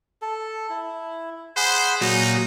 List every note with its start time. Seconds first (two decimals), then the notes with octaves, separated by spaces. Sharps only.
0.22 A4
0.70 E4
1.56 G#4 C5 F#5 B5
2.01 A#2 F#3 D#4